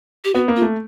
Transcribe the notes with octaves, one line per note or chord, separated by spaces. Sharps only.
G4
B3 F#4
A#3
F4
A3